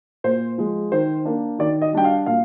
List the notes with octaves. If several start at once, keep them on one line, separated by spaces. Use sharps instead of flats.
A#2 C5
F3 G#3
D#3 C5
A#3 D4
D#3 D5
D#5
G3 D4 G5
F5
A#2 F5